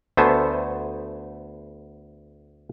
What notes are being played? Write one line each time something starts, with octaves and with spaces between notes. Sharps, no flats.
D2 A3 B3 C5 G#5 A5